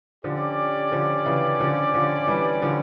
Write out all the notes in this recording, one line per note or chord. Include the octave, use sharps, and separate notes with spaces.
D3 F3 C#4 G4 D5
D3 F3
C#3 E3
D3 F3
D3 F3
E3 G3
D3 F3